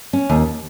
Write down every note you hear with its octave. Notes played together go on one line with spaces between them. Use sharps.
C#4
D#2